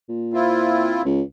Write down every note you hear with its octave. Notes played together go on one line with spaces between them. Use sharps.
A#2
C4 E4 F4
C#2